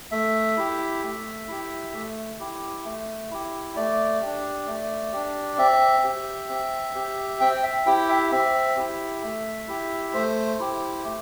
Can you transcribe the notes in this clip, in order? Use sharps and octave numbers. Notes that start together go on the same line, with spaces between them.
A3 E5
E4 G4
A3
E4 G4
A3
E4 G4
A3
E4 G4
A3 D5
D4 G4
A3
D4 G4
C4 E5
G4
C4
G4
C4 G5
E5
E4 G4 G5
E5
C4 E5
E4 G4
A3
E4 G4
A3 C5
E4 G4
A3